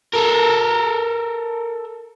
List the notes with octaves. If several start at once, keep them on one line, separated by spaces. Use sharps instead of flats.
A4 A#4